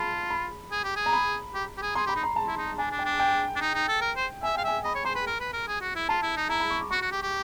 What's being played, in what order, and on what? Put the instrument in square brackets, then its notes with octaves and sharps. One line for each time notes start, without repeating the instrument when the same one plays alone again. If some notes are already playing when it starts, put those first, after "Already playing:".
Already playing: [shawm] F4 [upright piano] A5 B5
[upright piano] B5
[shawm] G#4
G4
G#4
[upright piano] A#5
B5
[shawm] G4
G4
G#4
[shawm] G#4 [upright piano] C6
[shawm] G4
[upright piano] B5
[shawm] D#4
[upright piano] A#5
A5
[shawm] E4
D#4
[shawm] D4 [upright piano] G#5
[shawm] D4
[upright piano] G5
[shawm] D4
[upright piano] G5
[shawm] D4
D#4
D#4
A4
A#4
C5
[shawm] E5 [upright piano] G#5
[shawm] F5 [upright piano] G5
[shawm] E5 [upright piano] G#5
[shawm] D#5 [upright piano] B5
[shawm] C#5
[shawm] C5 [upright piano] C6
[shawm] B4
A#4
B4
A#4
G#4
F#4
E4
[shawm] F4 [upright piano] A5
[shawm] E4
D#4
[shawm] E4 [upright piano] A#5
[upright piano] B5
C#6
D6
[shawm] F#4 [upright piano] C#6
[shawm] F#4
G4
G4